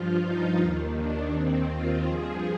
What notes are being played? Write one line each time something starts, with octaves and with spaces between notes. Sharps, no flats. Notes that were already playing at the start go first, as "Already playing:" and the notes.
Already playing: G2 F3 F4
D#4
D#2 D#3
D4
D#2 D#3 C4
F4
G2 F3 G#4